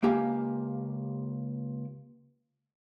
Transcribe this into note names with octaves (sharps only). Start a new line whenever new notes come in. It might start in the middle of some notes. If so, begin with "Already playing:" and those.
C#2 A#3 G4 F5 G#5